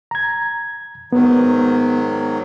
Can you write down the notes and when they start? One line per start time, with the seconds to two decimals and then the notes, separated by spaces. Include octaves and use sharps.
0.11 A#5 G#6
1.13 G#2 D#3 F#3 B3